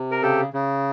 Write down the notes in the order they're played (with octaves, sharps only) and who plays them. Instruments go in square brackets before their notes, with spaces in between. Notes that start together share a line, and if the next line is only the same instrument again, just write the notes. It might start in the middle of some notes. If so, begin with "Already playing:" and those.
Already playing: [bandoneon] C3
A#4
C#3 G4 A4
C#3